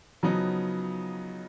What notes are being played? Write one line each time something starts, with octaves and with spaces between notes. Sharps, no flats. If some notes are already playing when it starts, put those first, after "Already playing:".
C#3 F3 F#3 B3 D#4